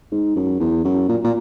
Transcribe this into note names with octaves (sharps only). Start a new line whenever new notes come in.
G#2
F#2
E2
F#2
A#2
A#2